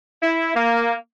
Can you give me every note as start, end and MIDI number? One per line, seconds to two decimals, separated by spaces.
0.22 0.53 64
0.55 0.93 58